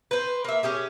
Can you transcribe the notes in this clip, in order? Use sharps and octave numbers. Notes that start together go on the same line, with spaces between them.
B4 C5
A#3 E5
C#4 G4 G#4